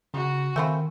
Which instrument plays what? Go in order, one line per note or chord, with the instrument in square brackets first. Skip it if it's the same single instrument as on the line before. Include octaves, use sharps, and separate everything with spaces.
[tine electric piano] C#3 [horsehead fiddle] F#4
[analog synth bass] D#3 [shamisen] A3 C4 F4 [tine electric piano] G#5 B5 C#6